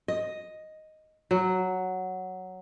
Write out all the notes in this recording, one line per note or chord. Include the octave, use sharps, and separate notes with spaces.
D#5
F#3